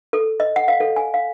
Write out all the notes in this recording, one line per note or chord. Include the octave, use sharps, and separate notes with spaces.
A4
D#5
F#5
F5
A4
G#5
F5